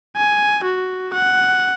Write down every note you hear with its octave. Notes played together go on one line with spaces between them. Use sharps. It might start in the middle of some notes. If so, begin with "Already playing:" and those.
G#5
F#4
F#5